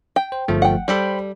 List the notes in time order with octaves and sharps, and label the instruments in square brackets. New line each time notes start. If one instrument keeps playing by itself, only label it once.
[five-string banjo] G5
[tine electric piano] C5
G1 F3 A3
[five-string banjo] F#5 G5
[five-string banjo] G3 A4 [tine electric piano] C5 G5 B5